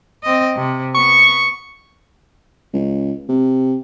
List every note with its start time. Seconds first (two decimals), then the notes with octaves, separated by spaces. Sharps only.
0.23 C4 D#5
0.56 C3
0.94 B3 C#6
2.74 C#2
3.29 C3